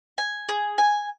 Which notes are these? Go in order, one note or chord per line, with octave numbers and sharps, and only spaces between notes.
G#5
G#4
G#5